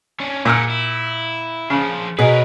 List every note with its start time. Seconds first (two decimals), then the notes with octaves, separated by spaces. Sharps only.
0.20 C#4 D4
0.45 A#2 G#4 F#5 E6 F6
0.70 E4
1.70 C#3 F3 D4
2.19 B2 G#4 A#4 B4 C#5